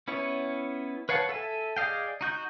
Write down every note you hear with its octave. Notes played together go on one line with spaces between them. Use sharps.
B3 C#4 E4 C#5
B4 C#5 F5 F#5 A5
A4 E5 G#5
G#4 D5 D#5 F5 G5
D#4 F#4 G6